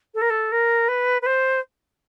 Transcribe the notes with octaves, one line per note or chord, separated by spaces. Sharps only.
A4
A#4
A4
A#4
B4
B4
C5